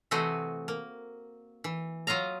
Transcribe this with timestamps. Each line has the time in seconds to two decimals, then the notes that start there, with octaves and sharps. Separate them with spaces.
0.11 C3 E3 A3 C4 F#4 D#5
0.68 A#3
1.64 E3
2.07 F#3 F4 D#5 F5 A#5